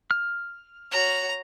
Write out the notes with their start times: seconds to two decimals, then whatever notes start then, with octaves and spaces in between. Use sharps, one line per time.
0.11 F6
0.92 F#4 C#5 A#5